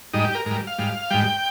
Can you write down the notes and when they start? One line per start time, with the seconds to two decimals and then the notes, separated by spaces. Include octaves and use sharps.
0.13 G#2 G3 D#4
0.25 G4
0.35 A#4
0.46 G#2 A#4
0.51 G3
0.67 F5
0.78 G#2 G3
1.10 G#2 G3 G5